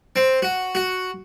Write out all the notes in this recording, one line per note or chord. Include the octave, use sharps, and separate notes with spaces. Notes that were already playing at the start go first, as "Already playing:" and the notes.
C4
F#4
F#4